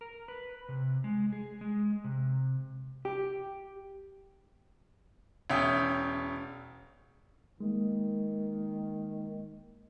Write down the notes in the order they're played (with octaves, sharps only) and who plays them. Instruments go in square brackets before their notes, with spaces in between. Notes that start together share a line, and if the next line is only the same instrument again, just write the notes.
[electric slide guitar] A#4
B4
C3
G#3
G#4
G#3
C3
[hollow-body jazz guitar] G4
[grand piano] E1 C#4 E5 G5 D#6 G6
[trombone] D#3 [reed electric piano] G#3 A#3